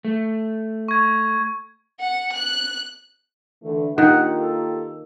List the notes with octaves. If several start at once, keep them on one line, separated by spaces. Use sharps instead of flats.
A3
C#6 G#6
F#5
F#6
D3 E3 A3
D#3 A#3 F4 G4 F#5
A4